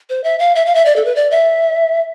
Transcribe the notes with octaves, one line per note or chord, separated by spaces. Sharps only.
C5
E5
F5
E5
F5
E5
D5
A4
B4
D5
E5